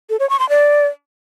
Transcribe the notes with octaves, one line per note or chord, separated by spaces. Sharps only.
A4
C#5
C#6
C6
D5